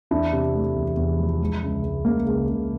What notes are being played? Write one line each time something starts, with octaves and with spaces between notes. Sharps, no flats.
E2 D4 E4
C3
A3
E2
E2
F3
G#3
C#2
C#2
C#2 A#3
C#2
C#2